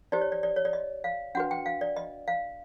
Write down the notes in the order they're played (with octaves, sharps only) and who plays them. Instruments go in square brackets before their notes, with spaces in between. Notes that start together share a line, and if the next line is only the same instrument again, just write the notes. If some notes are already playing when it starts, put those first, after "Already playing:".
[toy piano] D#4 G4 C5 D5
C#5
D5
D5
C#5
D5
D#5
F5
D4 F#4 B4 F#5
G5
F5
D5
D#5
F5